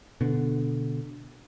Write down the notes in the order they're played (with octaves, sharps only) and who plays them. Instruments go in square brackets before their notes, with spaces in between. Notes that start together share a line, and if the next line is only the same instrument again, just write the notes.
[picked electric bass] B2 D3